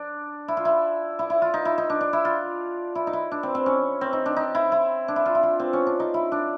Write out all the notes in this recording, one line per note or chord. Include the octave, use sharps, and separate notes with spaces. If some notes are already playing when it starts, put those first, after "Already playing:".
Already playing: D4
E4
F4
E4
E4
E4
F4
D#4
E4
D#4
D4
D4
E4
F4
E4
D#4
E4
D4
C4
C4
C#4
C4
D#4
D4
D#4
E4
E4
D4
E4
F4
E4
F4
C4
C#4
D4
D#4
E4
D4